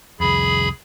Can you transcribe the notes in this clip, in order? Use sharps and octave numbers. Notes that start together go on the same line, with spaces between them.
C2 F2 G#4 B5